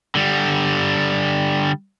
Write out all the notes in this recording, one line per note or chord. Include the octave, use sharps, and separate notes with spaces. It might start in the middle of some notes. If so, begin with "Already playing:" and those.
D3 G3